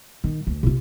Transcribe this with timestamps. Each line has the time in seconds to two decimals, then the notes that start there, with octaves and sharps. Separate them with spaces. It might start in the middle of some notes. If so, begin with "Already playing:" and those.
0.24 D#3
0.47 D2
0.63 C3 F4